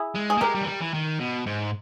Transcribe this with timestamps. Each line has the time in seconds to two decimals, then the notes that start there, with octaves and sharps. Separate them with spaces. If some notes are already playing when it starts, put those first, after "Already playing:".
Already playing: E4 G#4
0.15 G#3
0.30 G#4
0.38 A#3
0.41 G#3 G4 A#4
0.55 G3
0.61 E3
0.67 G3
0.80 E3
0.94 D#3
1.19 B2
1.46 G#2